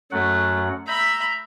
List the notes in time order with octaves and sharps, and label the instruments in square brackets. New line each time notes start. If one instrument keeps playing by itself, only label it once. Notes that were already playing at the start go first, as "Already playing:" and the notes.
[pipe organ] F#2 F#3 F#5 [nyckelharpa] A3
[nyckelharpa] E5 B5 [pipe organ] A#5 G6